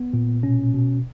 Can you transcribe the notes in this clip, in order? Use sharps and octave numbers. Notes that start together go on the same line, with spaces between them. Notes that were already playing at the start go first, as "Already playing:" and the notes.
Already playing: B3
A#2
B2 C#4
B2